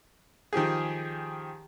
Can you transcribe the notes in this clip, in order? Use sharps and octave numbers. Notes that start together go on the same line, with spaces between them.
D#3 F3 G4 G#4